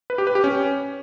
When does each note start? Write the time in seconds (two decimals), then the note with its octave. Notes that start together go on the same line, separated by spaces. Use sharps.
0.10 B4
0.18 G4
0.27 B4
0.35 G4
0.44 C#4